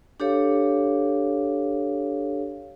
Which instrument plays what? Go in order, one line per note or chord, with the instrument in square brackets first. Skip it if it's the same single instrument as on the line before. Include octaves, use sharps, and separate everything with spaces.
[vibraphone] D4 G4 A4 C#5 F5